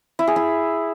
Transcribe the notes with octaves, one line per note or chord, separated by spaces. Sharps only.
E4
G#4
E4